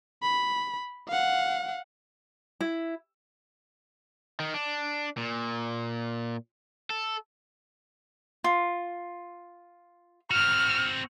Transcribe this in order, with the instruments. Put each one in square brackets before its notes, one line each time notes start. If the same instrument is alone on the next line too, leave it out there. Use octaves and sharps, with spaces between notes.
[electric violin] B5
F5 F#5
[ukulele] E4
[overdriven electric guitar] D#3
D4
A#2
A4
[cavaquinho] F4
[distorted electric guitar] C4 F#4 [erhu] F6